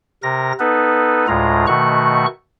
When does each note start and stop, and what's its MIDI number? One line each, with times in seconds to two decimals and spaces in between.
0.23 0.53 48
0.23 0.53 70
0.23 0.53 94
0.60 1.26 59
0.60 1.26 63
0.60 1.26 69
0.60 1.26 71
1.28 1.66 38
1.28 1.66 45
1.28 1.66 56
1.28 1.66 65
1.28 1.66 82
1.67 2.26 47
1.67 2.26 51
1.67 2.26 57
1.67 2.26 66
1.67 2.26 85
1.67 2.26 90